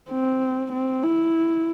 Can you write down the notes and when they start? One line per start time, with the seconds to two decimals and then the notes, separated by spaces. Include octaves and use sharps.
0.10 C4
0.72 C4
1.04 E4